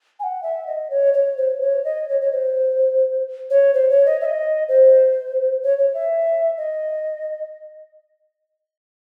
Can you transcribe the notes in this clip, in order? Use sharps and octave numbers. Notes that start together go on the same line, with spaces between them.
G#5
F#5
E5
D#5
C#5
C#5
C5
C#5
D#5
C#5
C#5
C5
C#5
C5
C#5
D#5
E5
D#5
C5
C#5
C#5
E5
D#5